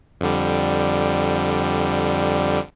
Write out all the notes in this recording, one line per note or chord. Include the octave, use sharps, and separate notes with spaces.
F2 D3 G3